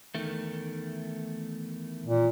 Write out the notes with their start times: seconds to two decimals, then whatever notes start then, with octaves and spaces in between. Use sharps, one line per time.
0.15 E2 D#3 A3
2.06 A#2